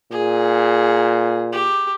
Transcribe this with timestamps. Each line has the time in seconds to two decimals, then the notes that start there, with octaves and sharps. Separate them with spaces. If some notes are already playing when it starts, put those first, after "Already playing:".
0.11 A#2 G#4
1.53 G4